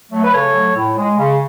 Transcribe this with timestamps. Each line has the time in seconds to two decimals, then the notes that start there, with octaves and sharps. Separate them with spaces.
0.12 F#3 A3
0.24 B4
0.34 C#3 A4 C#5
0.54 F#3 A3
0.77 A2
0.97 G#3
1.19 C#3